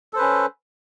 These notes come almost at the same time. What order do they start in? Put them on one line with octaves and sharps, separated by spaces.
A4 C5 B4 C#4